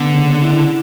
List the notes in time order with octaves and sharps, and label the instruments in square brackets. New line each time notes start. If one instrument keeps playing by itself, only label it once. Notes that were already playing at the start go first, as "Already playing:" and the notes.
Already playing: [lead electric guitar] D3 [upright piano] B3
[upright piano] C#3
E4